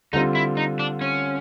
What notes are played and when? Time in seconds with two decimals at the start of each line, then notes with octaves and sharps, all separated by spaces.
0.13 D3 G3 C4 D#4 F4
0.35 E4
0.57 D#4
0.79 D4
1.01 C#4